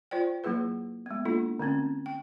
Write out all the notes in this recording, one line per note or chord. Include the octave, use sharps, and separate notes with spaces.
F4 C5 D5 G5
F#3 A#3 E4 G#4 B4
G#3 B3
A#3 D4 E4 F4 A4
D3 A3 C4 C#4
G5